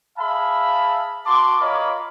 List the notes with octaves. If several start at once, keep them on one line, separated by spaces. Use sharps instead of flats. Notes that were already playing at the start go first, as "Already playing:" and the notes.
G#4 E5 F5 A5 B5
F#4 A5 C6 D6
F4 A#4 C#5 D#5 B5 D6